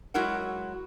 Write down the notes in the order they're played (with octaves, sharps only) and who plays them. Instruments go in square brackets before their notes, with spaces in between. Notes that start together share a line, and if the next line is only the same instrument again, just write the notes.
[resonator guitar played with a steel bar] F#3 G#3 E4 F#4 A#4 F#5